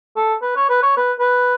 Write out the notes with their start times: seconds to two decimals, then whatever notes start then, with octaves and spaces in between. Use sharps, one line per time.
0.16 A4
0.42 B4
0.56 C#5
0.70 B4
0.83 C#5
0.97 B4
1.19 B4